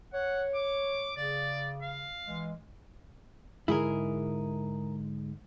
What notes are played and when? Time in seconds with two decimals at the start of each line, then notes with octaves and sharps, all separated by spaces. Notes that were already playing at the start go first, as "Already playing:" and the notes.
0.13 C#5 F#5
0.54 D6
1.16 C#3 D5
1.81 F5
2.27 E3 G#3
3.68 G#2 D3 G#3 E4 G#4 A#4